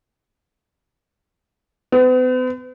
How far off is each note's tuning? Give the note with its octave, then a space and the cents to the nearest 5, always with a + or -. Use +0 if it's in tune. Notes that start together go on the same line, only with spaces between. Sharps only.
B3 +45